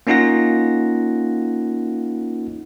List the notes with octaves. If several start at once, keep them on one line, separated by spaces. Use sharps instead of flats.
A#3 C#4 D#4 F4 F#5 A#6